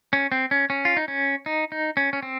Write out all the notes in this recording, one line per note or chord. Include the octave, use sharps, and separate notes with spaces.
C#4
C4
C#4
C#4
F4
D#4
C#4
D#4
D#4
C#4
C#4
C4